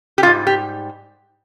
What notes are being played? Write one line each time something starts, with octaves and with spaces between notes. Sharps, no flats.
G4
G#2 G3 F4
G4